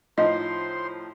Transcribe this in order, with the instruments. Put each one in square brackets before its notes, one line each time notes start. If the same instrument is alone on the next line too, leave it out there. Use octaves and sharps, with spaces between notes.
[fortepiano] A2 F3 D#4 [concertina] C5 C6 [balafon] D#5